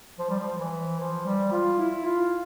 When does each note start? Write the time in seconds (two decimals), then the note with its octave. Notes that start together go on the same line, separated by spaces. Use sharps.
0.18 F3
0.30 G3
0.39 F3
0.58 E3
0.99 F3
1.25 G3
1.52 F4
1.79 E4
2.05 F4